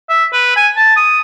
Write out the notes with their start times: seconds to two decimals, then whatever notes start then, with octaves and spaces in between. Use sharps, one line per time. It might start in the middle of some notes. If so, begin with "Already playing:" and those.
0.09 E5
0.33 B4
0.56 G#5
0.77 A5
0.97 D#6